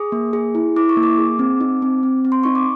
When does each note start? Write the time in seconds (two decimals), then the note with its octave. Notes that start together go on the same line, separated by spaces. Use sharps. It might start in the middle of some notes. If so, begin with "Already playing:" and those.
Already playing: G#4 D#6
0.12 A#3
0.33 G#4
0.55 E4
0.76 E4 D6
0.89 C#6
0.97 A#3
1.03 D6
1.18 G#4
1.39 C4
1.61 D#4
1.82 C4
2.03 C4
2.25 C4
2.32 C6
2.43 D#4 C#6
2.55 D6